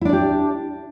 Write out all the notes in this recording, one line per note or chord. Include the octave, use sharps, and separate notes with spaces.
D4 E4 G4 D5